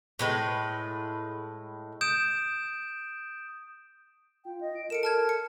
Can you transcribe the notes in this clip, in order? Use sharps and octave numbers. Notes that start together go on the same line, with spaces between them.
A2 G#3 B4
D#6 G6 D7 E7
F4 G5
D#5
D7
A4 A#4 C#7 D7 E7
A5 F6 G#6
C#7